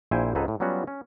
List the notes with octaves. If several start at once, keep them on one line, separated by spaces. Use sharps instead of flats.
A#1 A#2 E4 C5 G5 G#5
C#2 G#2 D#4 G#4 A4 B4
A2
F#3 G3 B3 C#4 F4 F#4
C#4